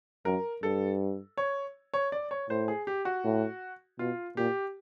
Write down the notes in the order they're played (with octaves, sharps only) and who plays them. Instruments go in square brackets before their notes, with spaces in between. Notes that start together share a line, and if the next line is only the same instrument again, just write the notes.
[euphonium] F#2 [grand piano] A#4
[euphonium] G2 [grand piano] A4
[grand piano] C#5
C#5
D5
C#5
[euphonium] A2 [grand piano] C5
[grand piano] G#4
G4
F#4
[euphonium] A2
[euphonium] B2 [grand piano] F4
[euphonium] A#2 [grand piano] G4